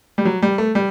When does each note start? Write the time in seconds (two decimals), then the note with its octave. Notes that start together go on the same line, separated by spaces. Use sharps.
0.18 G3
0.25 F#3
0.42 G3
0.58 A3
0.75 G3